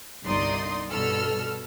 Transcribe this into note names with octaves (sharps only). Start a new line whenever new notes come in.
G1 C2 D#4 D5 C6 D#6
G2 B2 A4 E6 F6